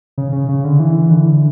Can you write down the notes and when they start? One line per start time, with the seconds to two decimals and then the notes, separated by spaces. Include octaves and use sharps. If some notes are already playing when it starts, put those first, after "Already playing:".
0.18 C#3
0.32 C#3
0.49 C#3
0.64 D3
0.80 E3
1.11 D3